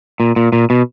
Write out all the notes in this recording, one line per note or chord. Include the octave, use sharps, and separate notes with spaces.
A#2
A#2
A#2
B2